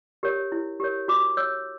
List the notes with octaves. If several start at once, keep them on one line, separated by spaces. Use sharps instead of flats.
G4 A#4 C#5
E4
G4 A#4 C#5
F#4 D6
C#5 E6